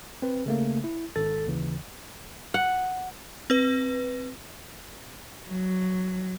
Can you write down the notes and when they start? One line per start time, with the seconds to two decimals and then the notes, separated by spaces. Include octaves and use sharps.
0.22 C4 B4
0.46 C#3 A3 A#3
0.84 E4
1.16 G#1 A4 A6
1.47 D#2 C#3 E3
2.54 F#5
3.50 C4 B4
5.48 F#3